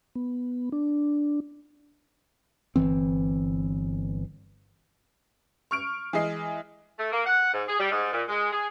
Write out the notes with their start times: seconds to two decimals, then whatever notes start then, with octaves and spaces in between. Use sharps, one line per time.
0.15 B3
0.72 D4
2.76 G1 F2 E3 C4
5.71 C#6 F6 D7
6.13 E3 G#3 D#5 C7
6.99 A3
7.12 A#3
7.26 F#5
7.54 G#2
7.68 G#4
7.79 G3
7.92 G#2
8.13 A#2
8.28 G#3
8.53 G#4